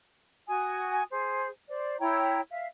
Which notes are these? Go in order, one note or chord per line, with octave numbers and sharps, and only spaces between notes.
F#4 G#5 D#6
G#4 C5
C5 D5
E4 C#5 G5 A#5
E5 F5